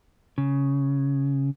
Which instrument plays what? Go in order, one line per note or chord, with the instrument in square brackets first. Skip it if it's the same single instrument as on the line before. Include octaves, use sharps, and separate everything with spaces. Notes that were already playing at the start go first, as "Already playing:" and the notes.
[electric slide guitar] C#3